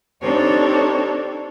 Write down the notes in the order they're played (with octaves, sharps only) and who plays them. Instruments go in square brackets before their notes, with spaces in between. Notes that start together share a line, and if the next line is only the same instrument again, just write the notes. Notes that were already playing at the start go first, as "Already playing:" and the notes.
[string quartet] C4 D4 D#4 G4 A4 C#5